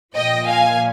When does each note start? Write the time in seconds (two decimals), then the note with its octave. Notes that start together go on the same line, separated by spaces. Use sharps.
0.16 A#2 F3 D#5 G5
0.47 F5 G#5